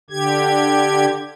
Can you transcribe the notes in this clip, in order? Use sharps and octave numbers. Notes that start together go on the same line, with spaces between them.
D3 G4 G#6